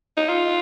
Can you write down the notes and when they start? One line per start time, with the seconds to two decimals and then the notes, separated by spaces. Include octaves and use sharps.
0.17 D#4
0.29 F4